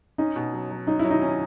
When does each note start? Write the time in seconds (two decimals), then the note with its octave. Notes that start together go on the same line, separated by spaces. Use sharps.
0.18 C#4 D#4
0.36 B2
0.53 F#3
0.71 F#3
0.87 F#3 D#4
0.99 E4
1.04 F#3
1.10 D#4
1.22 C#4